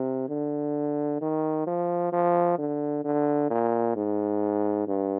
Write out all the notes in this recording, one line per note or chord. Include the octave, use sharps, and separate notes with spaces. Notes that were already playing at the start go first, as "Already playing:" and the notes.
Already playing: C3
D3
D#3
F3
F3
D3
D3
A#2
G#2
G2